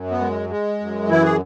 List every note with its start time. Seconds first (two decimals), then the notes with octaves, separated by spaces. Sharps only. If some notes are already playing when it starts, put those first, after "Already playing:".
Already playing: F#2
0.11 B3
0.20 G#3
0.49 G#3
0.80 F#2
1.09 E3 E4
1.23 G#4